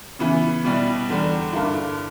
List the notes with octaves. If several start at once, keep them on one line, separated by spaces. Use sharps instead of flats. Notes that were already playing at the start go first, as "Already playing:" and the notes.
C#3 E3 B3 E4
B2 G3 B3 E4
E2 D3 G3
G2 D3 A#3 E4